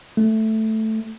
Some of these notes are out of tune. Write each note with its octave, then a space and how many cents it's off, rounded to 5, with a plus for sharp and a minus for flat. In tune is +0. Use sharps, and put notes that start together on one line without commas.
A3 +0